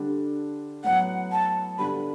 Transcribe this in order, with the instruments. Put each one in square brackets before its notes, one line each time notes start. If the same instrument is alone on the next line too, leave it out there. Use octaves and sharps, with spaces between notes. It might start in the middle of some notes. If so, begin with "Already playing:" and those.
Already playing: [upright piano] D3 G3 D4
[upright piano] A2 F#3 B3 [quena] F#5
[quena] A5
[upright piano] G2 D3 G3 B3 [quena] B5